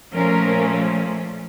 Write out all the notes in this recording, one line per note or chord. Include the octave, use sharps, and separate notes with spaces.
A#2 F3 A3 C#4 A#4